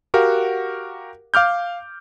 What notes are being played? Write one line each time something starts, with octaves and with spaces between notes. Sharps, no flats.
F#4 G4 A#4 F5 F#5
F5 D6 F6 G6